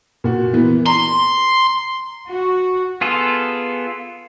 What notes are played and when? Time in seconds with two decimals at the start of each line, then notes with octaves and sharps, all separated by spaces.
0.24 A#2 F#4
0.53 E3 A#3 B3
0.86 A#5 C6
2.28 F#4
3.01 B3 F4 G#4 A4